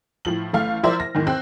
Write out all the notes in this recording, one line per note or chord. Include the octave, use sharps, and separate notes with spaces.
A2 F3 F#7
A1 A3 F5 F6
F3 E4 A#4 C5 D5 E5
A#6
E2 G#2 D#3
C4 F#6